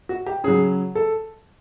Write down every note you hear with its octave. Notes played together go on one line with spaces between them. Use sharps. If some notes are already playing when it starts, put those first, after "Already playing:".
F#4
G4
C#3 F#3 G#4
A4